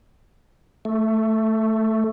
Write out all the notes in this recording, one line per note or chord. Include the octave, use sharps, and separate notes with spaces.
A3